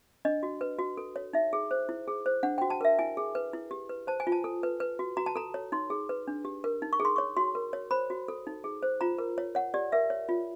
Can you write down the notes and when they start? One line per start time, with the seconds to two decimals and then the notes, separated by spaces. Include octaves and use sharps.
0.25 D4 D#5
0.43 F#4
0.61 B4
0.79 F#4
0.97 A4
1.16 C#5
1.33 D#4 E5
1.53 G#4
1.71 C5
1.89 E4
2.08 G#4
2.26 C5
2.43 D4 F#5
2.58 G5
2.61 F#4
2.70 A5
2.81 A#4 E5
2.99 E4 G#5
3.17 G#4
3.35 B4
3.53 E4
3.71 G4
3.89 B4
4.07 C5 A5
4.20 G#5
4.27 F4
4.32 A5
4.44 A4
4.63 B4
4.80 B4
4.99 F#4
5.17 F#4 A#5
5.26 A5
5.36 A4 A#5
5.54 C#5
5.72 D#4 C6
5.90 G#4
6.09 B4
6.28 D4
6.45 G4
6.64 A#4
6.82 D#4
6.93 C#6
7.00 G#4
7.05 C6
7.16 C#5 C#6
7.37 F#4 C6
7.55 A#4
7.73 C#5
7.91 C5 B5
8.10 F#4
8.28 A4
8.47 D#4
8.64 G#4
8.83 C5
9.01 F4 A#5
9.19 A#4
9.38 C#5
9.55 C#5 F#5
9.74 G4 D5
9.92 A#4 E5
10.10 C#5
10.29 F4